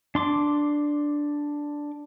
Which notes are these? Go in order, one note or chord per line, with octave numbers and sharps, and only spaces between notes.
D4 C6 D6